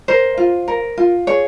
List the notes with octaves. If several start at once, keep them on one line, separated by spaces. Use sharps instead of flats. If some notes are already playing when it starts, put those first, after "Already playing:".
A#4 C5
F4
A#4
F4
G#4 C#5